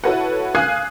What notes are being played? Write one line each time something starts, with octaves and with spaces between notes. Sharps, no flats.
E4 F#4 A4 B4 C#5 F#5
F5 G#5 D#6 F#6 G#6 C7